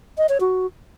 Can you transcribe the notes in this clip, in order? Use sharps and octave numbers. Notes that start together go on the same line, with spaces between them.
D#5
C#5
F#4